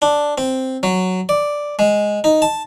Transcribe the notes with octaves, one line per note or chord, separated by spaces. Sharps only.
D4
C4
F#3
D5
G#3
D#4
A5